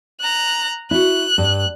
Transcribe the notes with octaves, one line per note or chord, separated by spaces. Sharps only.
A#5 F#6
E4 F#4 F#6
G2